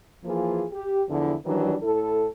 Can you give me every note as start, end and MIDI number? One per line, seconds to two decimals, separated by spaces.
0.25 0.64 52
0.25 0.64 53
0.25 0.64 58
0.25 0.64 65
0.25 0.64 68
0.72 1.03 67
1.09 1.35 40
1.09 1.35 50
1.09 1.35 53
1.09 1.35 64
1.45 1.76 51
1.45 1.76 52
1.45 1.76 54
1.45 1.76 55
1.45 1.76 62
1.83 2.26 45
1.83 2.26 64
1.83 2.26 69